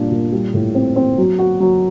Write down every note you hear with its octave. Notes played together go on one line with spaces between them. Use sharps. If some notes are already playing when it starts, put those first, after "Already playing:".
Already playing: A#2 G3 D4
A#2
G3
A2
C4
C4
F#3
F#4
F#3